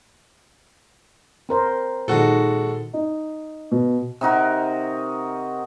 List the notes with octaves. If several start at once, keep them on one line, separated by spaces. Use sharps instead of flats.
C4 A#4 C5
A#2 D#3 G#3 F#4 A4
D#4
B2
C3 D#4 F#4 A#4